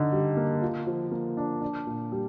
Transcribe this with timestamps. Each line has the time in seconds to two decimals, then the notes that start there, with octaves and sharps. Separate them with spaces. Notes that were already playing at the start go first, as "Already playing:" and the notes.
Already playing: D3 D#4
0.12 G3
0.37 A#3
0.62 F4
0.87 F3
1.12 A#3
1.37 D4
1.62 D4
1.87 A#2
2.12 G3